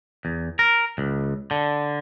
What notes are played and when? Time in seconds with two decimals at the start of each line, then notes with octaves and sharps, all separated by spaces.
0.25 E2
0.59 A#4
0.98 C#2
1.51 D3